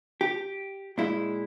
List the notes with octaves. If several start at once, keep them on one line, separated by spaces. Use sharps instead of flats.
G4
A#2 G#3 E4